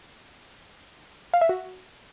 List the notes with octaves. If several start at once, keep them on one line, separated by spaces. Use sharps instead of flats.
F5
E5
F#4